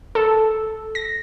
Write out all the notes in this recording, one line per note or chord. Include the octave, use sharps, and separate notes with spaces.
A4
A#6